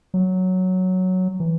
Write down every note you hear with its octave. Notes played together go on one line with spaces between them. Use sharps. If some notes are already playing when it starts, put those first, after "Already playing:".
F#3
E3